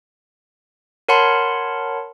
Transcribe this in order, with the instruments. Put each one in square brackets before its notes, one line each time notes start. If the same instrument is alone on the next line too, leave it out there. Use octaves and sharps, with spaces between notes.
[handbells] A#4 C#5 F#5 A5 B5 C6